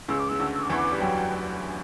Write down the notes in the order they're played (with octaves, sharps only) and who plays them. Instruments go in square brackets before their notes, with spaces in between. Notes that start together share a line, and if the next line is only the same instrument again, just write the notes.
[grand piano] C#2 C#3 [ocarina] E6
[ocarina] D6
[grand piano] C#3 [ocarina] E6
[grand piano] D2 D3
[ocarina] E6
D6
[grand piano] E2 E3 [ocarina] C#6
[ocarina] D6
[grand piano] G3
[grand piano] F#2 F#3 [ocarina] G5